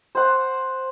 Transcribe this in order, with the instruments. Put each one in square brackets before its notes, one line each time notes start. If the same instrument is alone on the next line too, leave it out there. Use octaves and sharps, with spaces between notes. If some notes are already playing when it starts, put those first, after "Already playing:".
[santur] C5 F#5